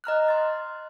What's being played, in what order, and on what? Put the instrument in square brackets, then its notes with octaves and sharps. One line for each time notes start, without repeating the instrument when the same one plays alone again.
[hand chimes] D#5 A#5 F6 F#6
C6 A6